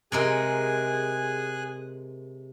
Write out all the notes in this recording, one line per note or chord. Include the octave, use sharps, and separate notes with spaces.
C3 G#3 G#4 A#4 G#5 F#6